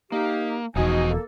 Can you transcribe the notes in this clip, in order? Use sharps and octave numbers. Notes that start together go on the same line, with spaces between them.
A#3 D#4 G4
E1 E2 F3 D#4 F#4 D#5 G#5
A#3 A4